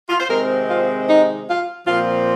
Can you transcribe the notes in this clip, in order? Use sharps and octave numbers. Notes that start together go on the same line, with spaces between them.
F4
C5
C3 D#3 G#3 C4 A#4
F4
D#4
F4
A#2 F3 C4 F4